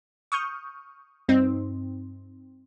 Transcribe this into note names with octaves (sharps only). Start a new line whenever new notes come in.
C#6 D#6 F6 G6
G2 C4 D#4